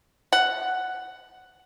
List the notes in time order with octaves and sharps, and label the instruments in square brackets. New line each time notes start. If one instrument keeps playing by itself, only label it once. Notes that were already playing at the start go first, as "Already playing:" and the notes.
[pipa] F#5